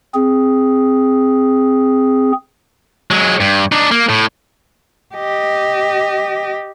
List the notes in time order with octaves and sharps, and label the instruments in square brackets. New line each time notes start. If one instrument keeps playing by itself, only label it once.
[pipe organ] C4 G#4
[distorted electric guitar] F#3 G#3
G2
D4 D#4
A#3
A2
[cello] G4 D#5